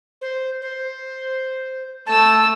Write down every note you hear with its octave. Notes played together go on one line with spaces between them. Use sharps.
C5
C5
A3 A5 E6